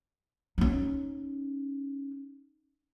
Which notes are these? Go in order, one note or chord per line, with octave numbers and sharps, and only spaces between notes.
C#4 D#4